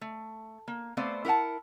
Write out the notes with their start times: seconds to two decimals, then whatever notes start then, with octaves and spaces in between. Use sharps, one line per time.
0.01 A3
0.68 A#3
0.97 A3 B3 C4 C5 D5 F5
1.25 E4 A#4 D#5 F#5 A5